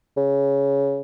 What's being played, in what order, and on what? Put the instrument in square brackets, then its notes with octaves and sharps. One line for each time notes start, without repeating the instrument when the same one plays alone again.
[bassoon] C#3